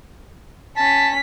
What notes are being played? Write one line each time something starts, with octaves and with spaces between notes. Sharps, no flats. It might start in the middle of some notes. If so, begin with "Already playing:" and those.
C#4 A5 B6